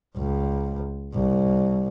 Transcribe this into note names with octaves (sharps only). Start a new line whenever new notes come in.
C#2
C2